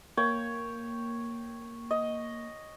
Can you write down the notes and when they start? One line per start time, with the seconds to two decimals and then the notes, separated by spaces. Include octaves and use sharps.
0.17 A#3 C#5 G5
1.91 D#5